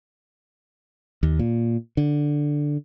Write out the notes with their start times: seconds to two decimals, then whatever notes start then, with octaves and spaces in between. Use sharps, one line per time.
1.23 D#2
1.39 A#2
1.97 D3